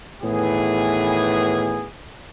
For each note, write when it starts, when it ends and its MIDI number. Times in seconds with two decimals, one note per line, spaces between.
0.22 1.88 45
0.22 1.88 51
0.22 1.88 52
0.22 1.88 59
0.22 1.88 68